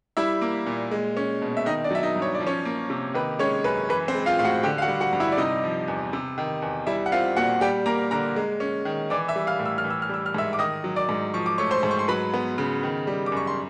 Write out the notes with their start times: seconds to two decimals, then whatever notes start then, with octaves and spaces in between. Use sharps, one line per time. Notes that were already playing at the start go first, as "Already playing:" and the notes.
0.17 G3 E4 E5
0.42 A#3
0.66 A#2
0.91 G#3
1.17 C#4
1.42 B2
1.57 E5
1.66 D#3 D#4 D#5
1.84 D4 D5
1.91 F#3 E5
2.03 D#4 D#5
2.16 G2
2.22 C#5
2.35 D5
2.40 F3
2.47 C#4 C#5
2.65 A#3
2.90 C3
3.14 D#3 B4
3.39 G#3 C#4 C#5
3.64 F#2 B4
3.89 E3 B4
4.08 C4 C5
4.15 G#3
4.26 F4 F5
4.39 A2 F5
4.45 F#4 F#5
4.63 D3 G4 G5
4.78 F5
4.82 F#4 F#5
4.88 G3
5.00 F#4 F#5
5.13 G2
5.20 E4 E5
5.32 D5
5.38 C3 D#4 D#5
5.64 F3
5.88 E2
6.13 C3
6.38 D#3
6.62 E2
6.87 G3 E4 E5
7.06 F#5
7.12 C4 F4 F5
7.37 A#2 F#4 F#5
7.61 G3 G4 G5
7.86 A#3 A#4 A#5
8.11 D3 A#4 A#5
8.36 G#3
8.60 C#4
8.85 D#3
9.10 E3 D5 D6
9.28 E5 E6
9.36 G3
9.47 F5 F6
9.59 A2
9.66 E6
9.78 F6
9.84 E3
9.90 E6
10.02 F6
10.09 G3 E6
10.26 F6
10.34 G#2 E5 E6
10.53 D6
10.59 D#3 D#5 D#6
10.84 F#3
10.96 D5 D6
11.09 G#2
11.34 F3 C#6
11.46 D6
11.58 A3 C#5 C#6
11.71 C5 C6
11.83 G#2
11.91 C#6
11.99 C6
12.08 F#3 B4 B5
12.33 B3
12.58 C#3
12.83 D#3
13.07 G3
13.26 D6
13.32 F#2 C#6
13.47 C6